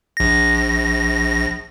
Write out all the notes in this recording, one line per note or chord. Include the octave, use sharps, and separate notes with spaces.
A#1 A#6